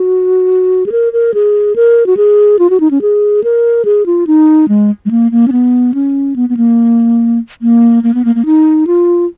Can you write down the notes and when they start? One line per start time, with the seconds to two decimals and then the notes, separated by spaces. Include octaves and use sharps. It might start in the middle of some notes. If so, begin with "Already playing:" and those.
Already playing: F#4
0.86 G#4
0.92 A#4
1.13 A#4
1.34 G#4
1.76 A#4
2.06 F#4
2.17 G#4
2.59 F4
2.70 F#4
2.80 D#4
2.91 C#4
3.02 G#4
3.44 A#4
3.85 G#4
4.06 F4
4.27 D#4
4.68 G#3
5.05 G#3
5.11 A#3
5.32 A#3
5.48 C#4
5.52 B3
5.94 C#4
6.36 B3
6.49 B3
6.57 A#3
7.62 A#3
8.03 A#3
8.14 B3
8.25 A#3
8.35 A#3
8.45 D#4
8.87 F4